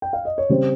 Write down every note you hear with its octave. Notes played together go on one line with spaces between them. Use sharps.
G5
F5
D#5
C#5
C#3 G3 C4 C5